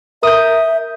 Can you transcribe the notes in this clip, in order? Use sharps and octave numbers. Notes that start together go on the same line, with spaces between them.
A#4 E5 D#6 G6